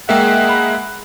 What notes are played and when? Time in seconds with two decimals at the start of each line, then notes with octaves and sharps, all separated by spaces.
0.09 G#3 A#3 G#4 E5 F#5 G5 E6
0.49 B5